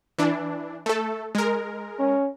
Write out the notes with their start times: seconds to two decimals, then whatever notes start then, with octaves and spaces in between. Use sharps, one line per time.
0.18 E3 D4
0.86 A3 A4
1.35 G#3 A#4
2.00 C#4